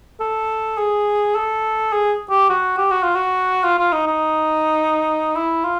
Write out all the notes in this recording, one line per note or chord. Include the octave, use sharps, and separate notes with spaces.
A4
G#4
A4
G#4
G4
F#4
G4
F#4
F4
F#4
F4
F4
D#4
D#4
E4
F4